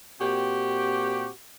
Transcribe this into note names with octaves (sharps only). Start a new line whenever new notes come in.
A#2 C4 F#4 G4